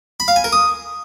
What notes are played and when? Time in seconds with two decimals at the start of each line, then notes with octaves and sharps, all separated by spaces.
0.20 B5
0.28 F5
0.36 G#5
0.44 A#4
0.53 D#6